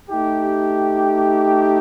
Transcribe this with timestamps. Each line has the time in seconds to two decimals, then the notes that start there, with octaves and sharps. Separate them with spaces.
0.10 A3 D#4 G4